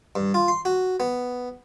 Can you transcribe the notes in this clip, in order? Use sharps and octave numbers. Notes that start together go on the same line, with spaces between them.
G2
F4
C6
F#4
B3